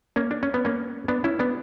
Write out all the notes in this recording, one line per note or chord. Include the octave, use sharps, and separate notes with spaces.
A#3 C#4
D4
C#4
B3
A#3 C#4
B3 D4
C#4 E4
B3 D4